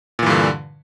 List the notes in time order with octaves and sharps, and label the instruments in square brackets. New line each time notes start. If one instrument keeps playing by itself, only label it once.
[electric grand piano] A#2
E3
G2
D3